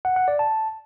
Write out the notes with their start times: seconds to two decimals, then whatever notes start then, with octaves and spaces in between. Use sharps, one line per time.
0.05 F#5
0.16 F#5
0.28 D5
0.39 A5